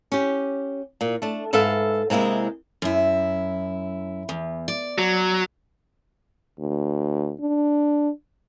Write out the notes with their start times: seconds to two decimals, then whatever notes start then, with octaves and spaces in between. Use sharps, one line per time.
0.12 C#4 G4
1.01 A#2
1.22 A3 D4
1.53 G#2 A4 B4 E5 F5
2.10 C3 G#3 A#3 E4 G#4
2.82 F#2 E4
4.29 E2
4.68 D5
4.98 F#3
6.59 D2
7.40 D4